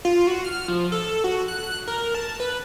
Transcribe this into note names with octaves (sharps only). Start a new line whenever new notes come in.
F4
F#4
F6
F3
A4
F#4
F#6
F#6
A#4
A5
B4